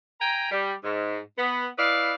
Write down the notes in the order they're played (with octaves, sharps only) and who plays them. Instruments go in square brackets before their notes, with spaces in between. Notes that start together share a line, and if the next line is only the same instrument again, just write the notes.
[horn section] G5 G#5 A#5
G3
G#2
B3
E4 B4 D5 D#5 F5